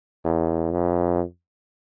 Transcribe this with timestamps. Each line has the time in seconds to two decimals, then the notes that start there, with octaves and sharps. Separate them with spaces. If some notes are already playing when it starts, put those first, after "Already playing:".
0.25 E2
0.72 F2